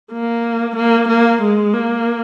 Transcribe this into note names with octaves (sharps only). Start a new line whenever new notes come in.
A#3
A#3
A#3
G#3
A#3